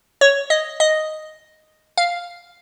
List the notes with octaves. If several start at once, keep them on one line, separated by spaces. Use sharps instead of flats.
C#5
D#5
D#5
F5